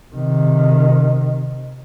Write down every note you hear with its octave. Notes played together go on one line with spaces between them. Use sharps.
C3 D#3